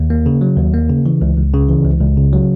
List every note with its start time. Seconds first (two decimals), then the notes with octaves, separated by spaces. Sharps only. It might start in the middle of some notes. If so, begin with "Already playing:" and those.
Already playing: D#2
0.10 A#3
0.26 C#3
0.41 F#3
0.57 D#2
0.74 A#3
0.89 C#3
1.06 E3
1.22 C#2
1.37 C#2
1.54 C#3
1.69 E3
1.85 C#2
2.01 C#2
2.17 C#3
2.33 F#3